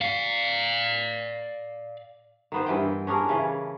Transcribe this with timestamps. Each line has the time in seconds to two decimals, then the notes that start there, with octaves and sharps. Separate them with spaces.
0.01 D5 F5
2.52 D#3 B3 C5
2.66 G2 E3 G5
3.07 C#4 D4 G#4 A#4
3.29 C#3 E3